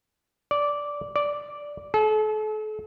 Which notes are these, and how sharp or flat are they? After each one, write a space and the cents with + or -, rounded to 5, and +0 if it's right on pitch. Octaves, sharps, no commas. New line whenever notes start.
D5 -10
D5 -5
A4 -40